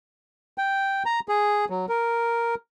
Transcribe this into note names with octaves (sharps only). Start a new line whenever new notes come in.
G5
A#5
G#4
F#3
A#4